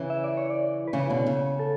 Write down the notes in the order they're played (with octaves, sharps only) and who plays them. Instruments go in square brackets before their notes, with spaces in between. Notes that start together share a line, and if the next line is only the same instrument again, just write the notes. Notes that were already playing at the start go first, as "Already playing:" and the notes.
Already playing: [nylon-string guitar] C#3 E3
[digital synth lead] E5
D5
C#5
D5
B4
[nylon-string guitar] C#3 E3 [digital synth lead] C#5
[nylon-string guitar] B2 D3
C#3
[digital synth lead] A4